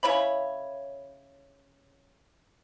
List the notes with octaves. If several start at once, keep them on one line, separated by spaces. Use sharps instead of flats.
C#3 E4 C#5 B5